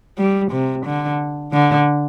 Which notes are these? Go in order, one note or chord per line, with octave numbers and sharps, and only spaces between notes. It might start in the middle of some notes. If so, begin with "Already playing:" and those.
G3
C3
D3
D3